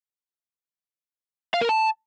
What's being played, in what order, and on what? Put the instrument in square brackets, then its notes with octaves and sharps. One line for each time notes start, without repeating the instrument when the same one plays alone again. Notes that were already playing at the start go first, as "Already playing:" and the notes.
[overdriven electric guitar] F5
A#4
A5